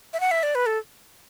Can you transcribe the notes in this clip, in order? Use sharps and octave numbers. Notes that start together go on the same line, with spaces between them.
E5
F#5
E5
D5
B4
A4